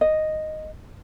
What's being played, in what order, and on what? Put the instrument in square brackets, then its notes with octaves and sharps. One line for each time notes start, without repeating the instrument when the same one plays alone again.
[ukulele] D#5